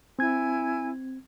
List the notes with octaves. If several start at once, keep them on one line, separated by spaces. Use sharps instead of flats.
C4 E4 G#5 G#6